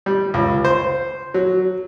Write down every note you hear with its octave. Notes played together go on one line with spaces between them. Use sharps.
G3
C#2
C5
F#3